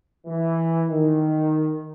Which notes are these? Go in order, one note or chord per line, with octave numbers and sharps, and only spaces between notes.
E3
D#3